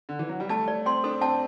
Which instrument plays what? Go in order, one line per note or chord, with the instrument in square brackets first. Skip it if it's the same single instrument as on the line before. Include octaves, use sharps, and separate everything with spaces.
[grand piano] D3
E3
F#3
G3
[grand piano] A3 [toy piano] A5
[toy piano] D5
[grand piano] C4 [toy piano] C6
[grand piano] D4 [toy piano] A4
[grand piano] C4 [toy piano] A5